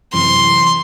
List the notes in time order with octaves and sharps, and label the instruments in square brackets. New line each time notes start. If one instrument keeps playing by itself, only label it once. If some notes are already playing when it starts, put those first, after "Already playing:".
[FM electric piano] F#2 C3 E3 [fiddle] C6